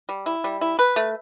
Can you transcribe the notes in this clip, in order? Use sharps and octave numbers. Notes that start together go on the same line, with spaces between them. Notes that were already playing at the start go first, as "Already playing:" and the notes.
G3
E4
G3
E4
B4
A3